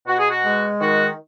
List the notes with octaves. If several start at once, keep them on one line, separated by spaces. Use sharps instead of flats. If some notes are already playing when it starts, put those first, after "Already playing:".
B2 F#4
G#4
F#4
G#3
D#3 F#4